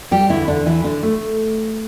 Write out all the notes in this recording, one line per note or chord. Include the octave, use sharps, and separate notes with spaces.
G3 G4
E2 D3 E3 E4
D3 D4
E3 E4
D3 D4
A3